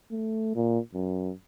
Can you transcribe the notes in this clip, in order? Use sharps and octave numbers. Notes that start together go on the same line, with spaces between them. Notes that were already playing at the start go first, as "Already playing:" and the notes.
A3
A#2
F#2